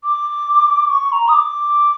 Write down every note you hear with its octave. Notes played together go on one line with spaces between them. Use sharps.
D6
C#6
A#5
D#6
D6